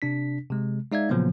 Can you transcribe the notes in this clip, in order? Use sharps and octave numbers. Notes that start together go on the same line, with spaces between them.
C3 D4 B6
C3 G#3
G#3 D#4 D5 E5 F5 G#6
A#2 C#3 F3 F#3 A#3 B3